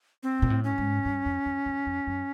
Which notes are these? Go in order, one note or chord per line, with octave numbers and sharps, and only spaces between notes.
C4
A#2
A2
C#4
G#2
G2
F2
F2
E2
F2
F#2